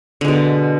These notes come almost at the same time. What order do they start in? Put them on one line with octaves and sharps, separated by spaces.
D3 G#3 B2